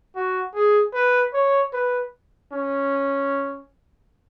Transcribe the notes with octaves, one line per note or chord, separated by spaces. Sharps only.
F#4
G#4
B4
C#5
B4
C#4